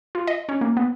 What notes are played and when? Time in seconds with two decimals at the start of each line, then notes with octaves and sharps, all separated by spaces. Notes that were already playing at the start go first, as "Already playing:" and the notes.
0.15 F4
0.27 D#5
0.49 C#4
0.61 A#3
0.77 B3